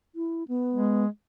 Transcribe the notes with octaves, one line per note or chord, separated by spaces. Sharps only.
E4
B3
G#3